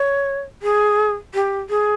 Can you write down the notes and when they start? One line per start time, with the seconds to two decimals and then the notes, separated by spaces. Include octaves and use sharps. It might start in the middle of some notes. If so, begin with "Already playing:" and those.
Already playing: C#5
0.62 G#4
1.34 G4
1.70 G#4